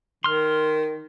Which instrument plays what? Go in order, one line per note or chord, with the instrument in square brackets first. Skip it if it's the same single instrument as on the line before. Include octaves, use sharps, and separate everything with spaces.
[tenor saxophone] D#3 [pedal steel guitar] C6 F6